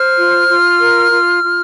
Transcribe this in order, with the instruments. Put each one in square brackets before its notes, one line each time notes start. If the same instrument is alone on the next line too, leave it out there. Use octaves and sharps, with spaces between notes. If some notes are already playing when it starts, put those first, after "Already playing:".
Already playing: [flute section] C5 F6
F4
F4
A#4
F4
F4